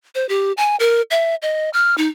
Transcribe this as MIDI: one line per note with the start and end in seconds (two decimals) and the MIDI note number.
0.15 0.28 72
0.29 0.52 67
0.57 0.76 80
0.80 1.02 70
1.11 1.35 76
1.42 1.70 75
1.73 1.95 89
1.98 2.08 63